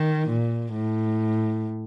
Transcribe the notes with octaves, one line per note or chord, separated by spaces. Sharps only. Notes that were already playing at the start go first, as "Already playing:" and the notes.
Already playing: D#3
A#2
A2